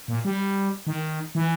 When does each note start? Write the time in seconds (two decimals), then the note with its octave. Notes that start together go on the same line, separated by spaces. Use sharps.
0.08 A#2
0.25 G3
0.87 D#3
1.35 E3